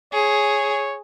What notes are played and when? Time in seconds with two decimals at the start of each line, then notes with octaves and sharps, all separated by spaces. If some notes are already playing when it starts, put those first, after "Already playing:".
0.13 G#4 C#5